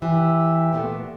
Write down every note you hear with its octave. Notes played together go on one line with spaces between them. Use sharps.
E3 G4 E5 E6
A#2 A3 B3